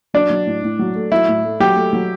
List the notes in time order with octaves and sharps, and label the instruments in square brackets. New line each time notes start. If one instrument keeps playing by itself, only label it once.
[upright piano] F#3 [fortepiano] D4
[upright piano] F#3
A2
A2
F#3
A3
[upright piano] F#3 [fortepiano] E4
[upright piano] A2
A3
[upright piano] F#3 [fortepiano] G4
[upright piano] A3
F#3